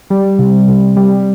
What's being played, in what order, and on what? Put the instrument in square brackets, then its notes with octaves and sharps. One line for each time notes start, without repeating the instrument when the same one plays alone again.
[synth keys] G3
C3
C3
G3